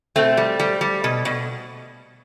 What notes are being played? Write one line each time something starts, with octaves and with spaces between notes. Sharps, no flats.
B2 A3 C4
G3
G3
G3
B2
B2